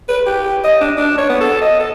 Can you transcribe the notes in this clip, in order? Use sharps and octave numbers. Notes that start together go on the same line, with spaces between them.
B4
G4
D#5
D4
D4
C#5
B3
A4
D#5
A4